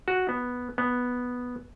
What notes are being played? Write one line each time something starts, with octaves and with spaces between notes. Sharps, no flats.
F#4
B3
B3